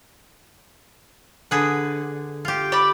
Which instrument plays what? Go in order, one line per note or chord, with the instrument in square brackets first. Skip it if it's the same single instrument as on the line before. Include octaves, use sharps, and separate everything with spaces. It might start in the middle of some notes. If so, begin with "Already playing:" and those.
[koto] D3 G#4 B4
F4 G4
[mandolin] D5 B5